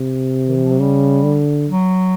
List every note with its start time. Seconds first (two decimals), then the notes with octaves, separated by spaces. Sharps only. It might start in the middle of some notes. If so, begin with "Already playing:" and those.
Already playing: C3
0.48 D#3
0.56 E3
0.64 F3
0.71 F#3
0.79 C#3 G3
1.23 D3
1.67 F#3